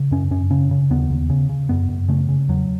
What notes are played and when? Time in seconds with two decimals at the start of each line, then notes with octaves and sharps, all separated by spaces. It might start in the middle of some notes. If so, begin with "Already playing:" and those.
Already playing: C#3
0.11 F#2 C#4
0.31 F#2 C#4
0.51 C#3 C#4
0.71 C#3
0.90 D#2 B3
1.10 D#2
1.30 C#3
1.49 C#3
1.69 F#2 B3
1.89 F#2
2.08 C#3 A3
2.29 C#3
2.49 E2 F#3